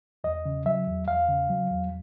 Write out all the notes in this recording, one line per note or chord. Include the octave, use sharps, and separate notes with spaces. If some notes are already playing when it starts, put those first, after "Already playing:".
E2 D#5
C#3
F#3 E5
E2
E2 F5
C#3
F#3
E2